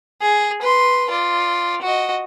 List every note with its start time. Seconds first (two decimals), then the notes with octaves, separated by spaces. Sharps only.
0.21 G#4
0.62 B4 C6
1.10 F4 D5
1.82 F#4 D#5